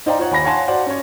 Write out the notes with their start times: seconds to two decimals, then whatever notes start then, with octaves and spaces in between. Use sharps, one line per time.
0.06 D#4 C5 D5 F5 G5 A#5
0.19 F4 C5 C#5 F#5
0.31 D#2 G#5 B5 A#6
0.44 C#5 F5 F#5 G#5 A5 C6
0.68 F#4 C5 D5 F5 F#5
0.87 C#4 C#5